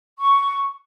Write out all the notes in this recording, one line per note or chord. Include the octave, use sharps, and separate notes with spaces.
C#6